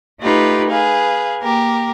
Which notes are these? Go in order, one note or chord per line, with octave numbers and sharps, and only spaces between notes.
A3 D#4 F4 G4 B4
G#4 B4 F5
A#3 G4 A#4